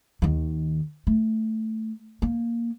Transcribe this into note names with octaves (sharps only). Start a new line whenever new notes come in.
D#2 D#3
A3
A#3